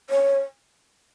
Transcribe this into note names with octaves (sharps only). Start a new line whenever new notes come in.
C#5